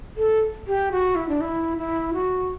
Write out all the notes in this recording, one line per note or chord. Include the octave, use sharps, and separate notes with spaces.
A4
G4
F#4
E4
D4
E4
E4
F#4